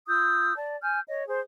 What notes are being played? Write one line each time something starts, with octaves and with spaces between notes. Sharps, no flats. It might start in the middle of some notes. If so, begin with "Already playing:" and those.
F4 D#6 E6 G6
D5 A5
G#5 F6 G6
C#5 D#5
G#4 C5